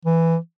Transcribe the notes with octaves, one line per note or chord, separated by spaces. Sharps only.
E3